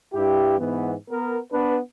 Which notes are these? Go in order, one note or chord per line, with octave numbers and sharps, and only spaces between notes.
G2 E4 G4
G#2 E3 B3
B3 A#4
B3 D4 B4